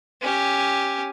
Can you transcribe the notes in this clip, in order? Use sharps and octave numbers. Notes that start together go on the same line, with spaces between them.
C#4 G4